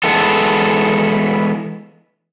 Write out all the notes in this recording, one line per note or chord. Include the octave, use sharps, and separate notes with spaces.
E3 G#3 B3 A4